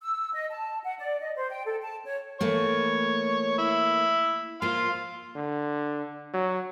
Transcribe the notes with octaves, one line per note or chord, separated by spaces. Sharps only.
E6
D#5
A5
F#5
D5
D#5
C5
G5
A4
A5
C#5
E3 A3 A#3 C#5
E4
F3 A#3 F5 C6
D3
F#3